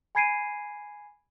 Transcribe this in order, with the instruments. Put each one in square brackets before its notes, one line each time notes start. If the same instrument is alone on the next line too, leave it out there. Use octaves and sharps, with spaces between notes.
[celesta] G#5 B5 G#6 C7 D7 D#7